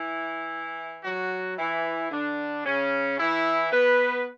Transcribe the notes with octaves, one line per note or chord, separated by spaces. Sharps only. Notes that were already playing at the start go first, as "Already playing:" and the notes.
Already playing: E3 E4
F#3 F#4
E3 E4
D3 D4
C#3 C#4
E3 E4
B3 B4